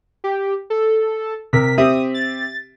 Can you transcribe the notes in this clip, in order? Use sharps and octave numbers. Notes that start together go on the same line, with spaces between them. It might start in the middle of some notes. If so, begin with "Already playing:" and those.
G4
A4
C3 A#4 B6
C4 G4 E5 D#6
A6